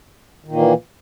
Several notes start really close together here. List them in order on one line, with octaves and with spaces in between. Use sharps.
D#3 A#2 A#3 E3